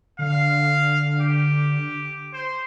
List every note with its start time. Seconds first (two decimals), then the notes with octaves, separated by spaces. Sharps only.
0.19 D3 F5
1.21 G4
2.33 C5